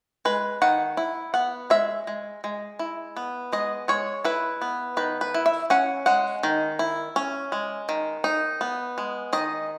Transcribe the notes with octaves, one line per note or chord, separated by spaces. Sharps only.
G#3 B4
D#3 F#5
E4
B3 F#5
G#3 E5
G#3
G#3
E4
B3
G#3 D#5
G#3 C#5
E4 B4
B3
D#3 B4
B4
E4
E5
C#4 F#5
G#3 F#5
D#3
E4
C#4
G#3
D#3
D#4
B3
G#3
D#3 D#5